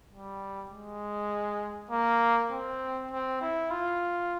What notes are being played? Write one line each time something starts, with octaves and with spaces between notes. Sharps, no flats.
G3
G#3
A#3
C4
C4
E4
F4